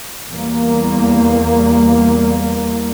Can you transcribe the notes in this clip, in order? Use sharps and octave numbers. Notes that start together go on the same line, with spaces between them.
E2 G3 A#3